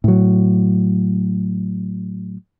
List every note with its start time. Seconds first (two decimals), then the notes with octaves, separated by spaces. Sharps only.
0.04 A2 F#3